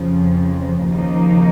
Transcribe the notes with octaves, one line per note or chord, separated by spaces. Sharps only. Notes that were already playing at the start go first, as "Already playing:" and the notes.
Already playing: F2 C#3 F3
D#2 C#3 F3 A#3 D#4